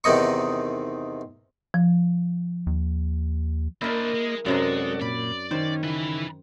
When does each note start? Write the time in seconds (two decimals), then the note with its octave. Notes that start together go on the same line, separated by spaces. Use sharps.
0.04 E2 C3 D#3 D#4 D#5 C#6
1.74 F3
2.67 D#2
3.82 A#3 D4 E4 A#4 C5 D5 D#5
4.15 G#3
4.46 F#2 C3 G#3 F#4 A4 D5 A#5
5.01 A#2 D5 B5
5.51 D#3 C#4 C5
5.83 C#3 E3 E4 B4